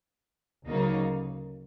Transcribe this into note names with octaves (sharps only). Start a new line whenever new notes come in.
D2 C#3 F#3 A#3 D#4